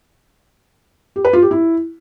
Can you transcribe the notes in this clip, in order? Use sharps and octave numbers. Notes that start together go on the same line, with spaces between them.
G4
B4
F4
G4
E4